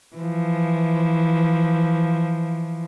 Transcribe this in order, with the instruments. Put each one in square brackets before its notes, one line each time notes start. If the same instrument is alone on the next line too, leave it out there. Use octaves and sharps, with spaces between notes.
[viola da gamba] E3 F3